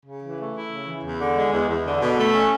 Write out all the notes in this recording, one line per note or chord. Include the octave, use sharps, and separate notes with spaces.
C#3
E3
A3
E4
C#3
E3
E2
D3
G#3
E2
E2
D3
B2
A3
C#4